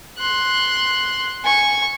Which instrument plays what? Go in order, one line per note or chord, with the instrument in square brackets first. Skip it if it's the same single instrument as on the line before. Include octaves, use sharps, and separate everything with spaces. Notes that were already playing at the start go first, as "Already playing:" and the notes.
[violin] C6 F#6
G#5 C#6